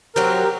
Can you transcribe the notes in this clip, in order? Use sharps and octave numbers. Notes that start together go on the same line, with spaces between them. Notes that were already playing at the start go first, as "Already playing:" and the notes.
F#3 C4 G4 A#4
A#4